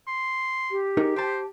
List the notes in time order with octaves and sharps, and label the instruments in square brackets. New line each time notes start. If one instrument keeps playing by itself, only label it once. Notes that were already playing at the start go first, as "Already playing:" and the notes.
[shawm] C6
[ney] G4
[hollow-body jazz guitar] D#4 G#4 A#4
[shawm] C5 [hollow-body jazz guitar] G5 A5